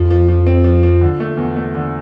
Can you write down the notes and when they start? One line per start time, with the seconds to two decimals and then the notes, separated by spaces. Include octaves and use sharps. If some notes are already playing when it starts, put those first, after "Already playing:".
Already playing: F2 F3
0.11 F3
0.28 F3
0.47 C4
0.64 F3
0.83 F3
1.01 D3
1.20 A3
1.37 E2
1.57 A3
1.75 D3